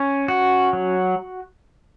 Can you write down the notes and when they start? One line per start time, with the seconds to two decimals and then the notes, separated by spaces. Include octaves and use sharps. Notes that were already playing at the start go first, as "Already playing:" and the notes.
Already playing: C#4
0.28 F#4
0.73 F#3